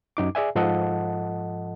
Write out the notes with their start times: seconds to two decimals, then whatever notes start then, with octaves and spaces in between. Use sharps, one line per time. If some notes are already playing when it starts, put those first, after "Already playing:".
0.17 F#2 D#4 D6
0.35 G#4 D5 E5 G#5
0.55 G#2 F3 A4 D#5 F#5 A5